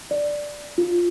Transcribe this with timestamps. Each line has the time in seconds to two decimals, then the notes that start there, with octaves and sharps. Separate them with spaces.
0.11 D5
0.78 F4